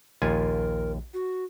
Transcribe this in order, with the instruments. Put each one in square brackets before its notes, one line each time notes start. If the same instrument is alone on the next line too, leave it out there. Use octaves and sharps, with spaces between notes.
[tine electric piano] A#1 [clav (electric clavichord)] D#2 F4 G#5 [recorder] A#4
[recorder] F#4